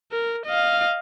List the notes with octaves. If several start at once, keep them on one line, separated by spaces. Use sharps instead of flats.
A#4
D#5 F5